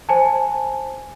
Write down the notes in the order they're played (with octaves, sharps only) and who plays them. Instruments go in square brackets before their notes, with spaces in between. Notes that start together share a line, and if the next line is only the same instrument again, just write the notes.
[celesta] C5 G#5 A5